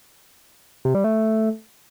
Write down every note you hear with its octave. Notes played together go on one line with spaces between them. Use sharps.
C3
G3
A3